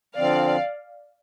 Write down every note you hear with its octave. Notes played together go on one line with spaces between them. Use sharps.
D3 F3 C4 D5 F5